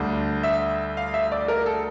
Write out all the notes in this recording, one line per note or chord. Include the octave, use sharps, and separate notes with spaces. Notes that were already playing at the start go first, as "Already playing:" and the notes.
Already playing: D2 D3 G3 D4
E5
F5
E5
D5
A#4
A4